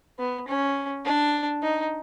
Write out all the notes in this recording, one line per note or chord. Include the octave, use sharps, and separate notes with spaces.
B3
C#4
D4
D#4